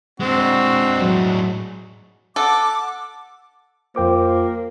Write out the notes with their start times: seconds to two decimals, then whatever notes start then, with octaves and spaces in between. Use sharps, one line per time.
0.20 G#3 C4 D4 F#4
0.97 A2 F#3
2.36 A4 F#5 D6
3.96 F2 A#3 F4 C5 G5 D6